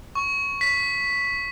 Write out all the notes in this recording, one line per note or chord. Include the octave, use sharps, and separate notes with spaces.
C#6
B6